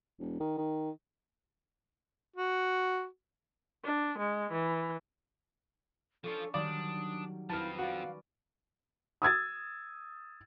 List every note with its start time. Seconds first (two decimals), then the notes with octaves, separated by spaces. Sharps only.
0.20 E1
0.40 D#3
0.58 D#3
2.36 F#4
3.84 D4
4.19 G#3
4.52 E3
6.24 F3 C#4 D4 F4 A4 C#5
6.54 D#3 F#3 G3 D4 D5 D#6
7.50 F3 C4 E4 A#4 B4 A5 F6
7.78 C#4 F#4 D5 F5
9.22 D#6 E6 G#6 A6